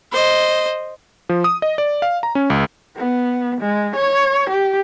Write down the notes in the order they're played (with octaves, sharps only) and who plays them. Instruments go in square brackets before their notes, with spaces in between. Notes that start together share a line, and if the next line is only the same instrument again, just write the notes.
[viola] C5 D#5
[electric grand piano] F3
D#6
D#5
D5
F5
A#5
C#4
C#2
[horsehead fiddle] B3
G#3
C#5
G4